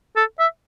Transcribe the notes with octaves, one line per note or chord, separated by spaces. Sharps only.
A4
E5